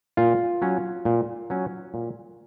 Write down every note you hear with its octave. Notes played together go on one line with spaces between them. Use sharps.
A#2 F4
F#3 C#4
A#2
F#3 C#4
A#2